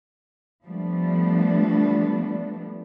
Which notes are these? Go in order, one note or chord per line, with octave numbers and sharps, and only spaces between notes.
F3 G3 A3 B3 D4